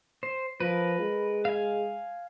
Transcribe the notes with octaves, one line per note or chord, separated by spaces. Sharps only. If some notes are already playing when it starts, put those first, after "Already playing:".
C5
F3 A#4 B4
G#3
F5 G#5